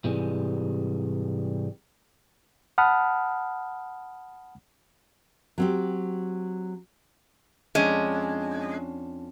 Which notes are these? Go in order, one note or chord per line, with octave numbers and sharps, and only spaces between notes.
G#2 C3 E3 G3 G#3
F#5 A5 B5 D#6 F6
F#3 C4 G4
F2 G#3 C#4 D4